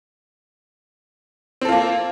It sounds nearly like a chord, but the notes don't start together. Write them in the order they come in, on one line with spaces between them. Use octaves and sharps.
C4 A4 F4 A#3